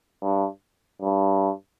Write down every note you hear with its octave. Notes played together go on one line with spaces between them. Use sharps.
G2
G2